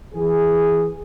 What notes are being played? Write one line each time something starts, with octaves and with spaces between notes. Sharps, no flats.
E3 G#4